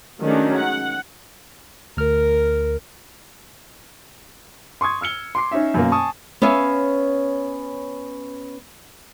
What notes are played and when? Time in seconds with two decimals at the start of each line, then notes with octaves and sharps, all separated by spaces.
0.20 D#3 F#3 G#3 A3 C#4 D4
0.54 F#5
1.97 D2 A#4 F6
4.81 C6 C#6 D#6 G#6
5.01 E6 F6 C#7 G7
5.35 C6 D6 C7
5.52 C#4 D#4 E5
5.74 F#2 B2 A#3
5.92 G#5 A5 C#6 D#6
6.42 B3 C#4 C#5 E5 F5